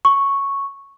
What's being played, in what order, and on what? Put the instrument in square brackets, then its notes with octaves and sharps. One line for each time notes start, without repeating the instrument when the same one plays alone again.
[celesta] C#6